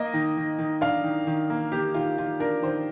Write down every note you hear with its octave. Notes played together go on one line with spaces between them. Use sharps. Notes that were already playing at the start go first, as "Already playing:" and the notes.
Already playing: A#3 D#5
D#3
D#3
D#3
D4 F5
D#3
D#3
A#3
A#3 G4
D#3 F4
D#3 F4
D4 A#4
D#3 C5